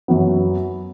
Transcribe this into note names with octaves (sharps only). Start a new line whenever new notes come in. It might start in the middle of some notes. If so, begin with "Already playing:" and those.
F#2 F#3 B3